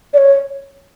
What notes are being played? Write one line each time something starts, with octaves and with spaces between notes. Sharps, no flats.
D5
C#5